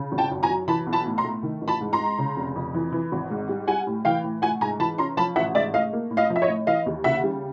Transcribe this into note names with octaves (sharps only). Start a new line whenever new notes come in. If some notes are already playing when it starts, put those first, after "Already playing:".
Already playing: C#3
G#1
G5 A5
F#2
G#5 A#5
F#3
E3 A5 B5
B1
A5 B5
A2
A#5 C6
A3
D#3
A1
A5 B5
G#2
A#5 C6
G#3
C#3
F1
F2
E3
E3
G#1
G#2
G3
G3 F#5 G#5
A2
E3 F5 G5
A2
A3 F#5 G#5
G#2 G#5 A#5
E3 A5 B5
C#4 A#5 C6
F3 A5 B5
A1 E5 F#5
G#2 D5 E5
A3 D#5 F5
A#3
A2
D#5 F5
F3
E5
C#5 D#5
A2
E3 D#5 F5
D#2
C#3 E5 F#5
G3